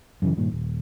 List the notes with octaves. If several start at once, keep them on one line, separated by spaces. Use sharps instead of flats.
F#2 C#3 E3
G2 A#2 D#3
D#1